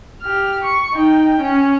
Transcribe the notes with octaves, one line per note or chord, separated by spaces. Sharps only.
G4 F6
C#6
D#4 G5
C#4